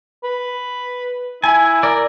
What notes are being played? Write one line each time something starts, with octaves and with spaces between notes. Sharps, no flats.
B4
E4 G#5
A#4 D5